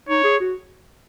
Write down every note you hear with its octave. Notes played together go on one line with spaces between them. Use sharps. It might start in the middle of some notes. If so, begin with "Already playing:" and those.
D#4 C#5
G#4
F#4